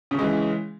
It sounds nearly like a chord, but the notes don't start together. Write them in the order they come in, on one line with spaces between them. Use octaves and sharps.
C#3 C#4 G#3 E3